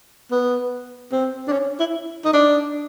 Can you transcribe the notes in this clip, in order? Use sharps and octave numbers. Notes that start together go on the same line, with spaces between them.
B3
C4
D4
C#4
E4
D#4
D4